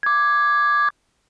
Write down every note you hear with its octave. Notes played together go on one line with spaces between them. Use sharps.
D6 G#6